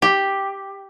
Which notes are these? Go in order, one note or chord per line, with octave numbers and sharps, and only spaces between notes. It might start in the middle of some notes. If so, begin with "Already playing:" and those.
G4